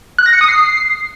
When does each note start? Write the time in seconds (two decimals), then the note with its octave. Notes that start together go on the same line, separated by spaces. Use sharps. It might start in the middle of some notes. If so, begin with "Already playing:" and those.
0.18 F#6
0.26 A#6
0.33 C#7
0.41 D#6
0.48 C7